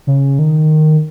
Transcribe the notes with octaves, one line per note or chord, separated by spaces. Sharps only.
C#3
D#3